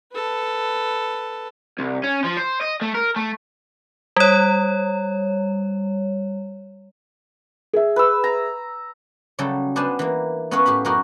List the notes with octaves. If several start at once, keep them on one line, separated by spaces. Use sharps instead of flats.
A4 B4
C2
C#4
F3
C5
D#5
A3
A#4
A3
G3 C#5
G#4 E5
B4 E6
A#5
C#3 F#3 G3 A4 G5
B3 D4 G4 C5 G#5 A5
E3 A#3
B3 C#4 A#4 B4 C#5 F5
A2 G4 F5 B5
F#2 D#4 E4 F#4 G4 A#4